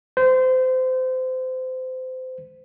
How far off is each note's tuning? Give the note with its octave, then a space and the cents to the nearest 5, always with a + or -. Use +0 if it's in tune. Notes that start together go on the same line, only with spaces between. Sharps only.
C5 -25